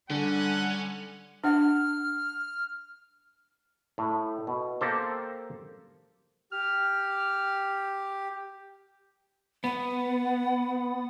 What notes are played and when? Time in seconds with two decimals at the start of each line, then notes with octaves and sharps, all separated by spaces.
0.10 D3 G3 C#4 F#5
1.44 D4 F#5 F6
3.98 A2
4.47 B2
4.81 A#3 G4 A4 C5
6.52 G4 F6
9.64 B3 F#5